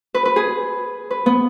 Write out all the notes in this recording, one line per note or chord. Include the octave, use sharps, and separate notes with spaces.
B4
B4
G#4
B4
B3